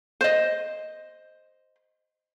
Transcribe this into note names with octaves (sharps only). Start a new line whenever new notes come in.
C5 D#5